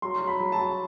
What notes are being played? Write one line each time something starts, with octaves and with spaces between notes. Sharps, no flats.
F#3 C6
F#3
B5
F#3
A5
F#3